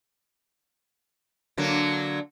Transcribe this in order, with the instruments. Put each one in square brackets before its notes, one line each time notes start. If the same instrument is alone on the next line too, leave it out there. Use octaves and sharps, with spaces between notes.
[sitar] D3 F#3 A#3